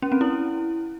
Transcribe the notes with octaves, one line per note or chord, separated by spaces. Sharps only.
C#4
C4
E4